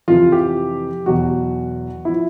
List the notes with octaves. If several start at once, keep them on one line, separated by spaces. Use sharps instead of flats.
F2 C3 E3 F4
G4
E2 B2 F#3 F#4
F3 E4